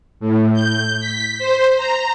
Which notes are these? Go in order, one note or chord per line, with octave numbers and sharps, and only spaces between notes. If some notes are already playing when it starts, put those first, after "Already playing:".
A2
G6
B6
C5
A#5